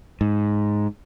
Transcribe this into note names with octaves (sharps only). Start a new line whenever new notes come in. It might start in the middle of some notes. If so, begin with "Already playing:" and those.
G#2